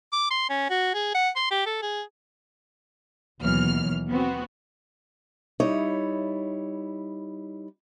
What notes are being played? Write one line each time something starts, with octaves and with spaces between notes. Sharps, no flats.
D6
C6
C#4
F#4
G#4
F#5
C6
G4
A4
G#4
D#2 B2 E3 F#3 F6
B3 C4 F#4
G3 D#4 E4 C#5